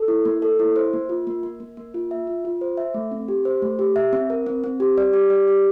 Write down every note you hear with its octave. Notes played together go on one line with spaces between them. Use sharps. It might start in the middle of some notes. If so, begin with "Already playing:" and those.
Already playing: A4
E4
A#3
A4
E4
C5
A#3
F4
A#3
A#3
A#3
A#3
F4
E5
F4
F4
C5
E5
A3
C4
G4
C5
A3
G4
E5
C4
A#4
C4
C4
G4
D5
G4
D5
G4